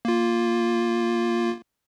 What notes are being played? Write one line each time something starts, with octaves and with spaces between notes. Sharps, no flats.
A#3 F4